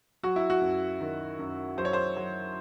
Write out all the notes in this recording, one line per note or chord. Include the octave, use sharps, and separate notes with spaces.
F#3 F#4
E4
F#4
F#2
D#3
F#2
F#3 C5
C#5
C5
F#3